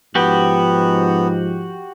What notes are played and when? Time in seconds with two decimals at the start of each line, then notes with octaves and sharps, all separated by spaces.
0.15 G#2 F3 B3 F#4 G4 G5